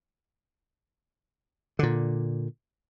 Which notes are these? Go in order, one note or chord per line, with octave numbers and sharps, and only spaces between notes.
A#2 D3